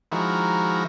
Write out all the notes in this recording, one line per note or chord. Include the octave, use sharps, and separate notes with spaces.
D#3 F3 G#3 E4 F#4 A#4